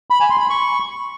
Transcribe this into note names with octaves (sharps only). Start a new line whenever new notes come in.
B5
G#5
C6
B5
C#6